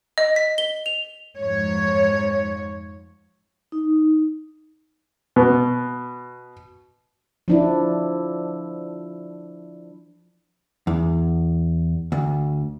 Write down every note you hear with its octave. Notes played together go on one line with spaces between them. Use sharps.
D#5
B6
G7
F7
F2 G#2 F3 C#5
D#4
B2
F3 D4 E4
E2
D2